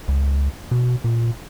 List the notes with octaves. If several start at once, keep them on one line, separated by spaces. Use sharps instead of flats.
C#2
B2
A#2